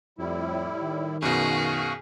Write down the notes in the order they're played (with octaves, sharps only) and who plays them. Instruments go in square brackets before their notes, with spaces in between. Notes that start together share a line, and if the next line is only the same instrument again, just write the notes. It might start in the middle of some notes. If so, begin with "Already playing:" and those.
[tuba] F2 [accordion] A2 G3 E4
[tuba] D#3
[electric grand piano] F#2 B2 [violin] G#4 [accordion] F5 F#5 C#6